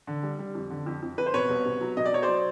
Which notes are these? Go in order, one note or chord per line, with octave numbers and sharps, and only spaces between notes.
D3
G3
G3
F2
D3
F2
F2
F2 B4
C5
B2 B4 C#5
C2
B2
F#3
B2 D#5
D5
F#3 C#5
C5 D5
F#3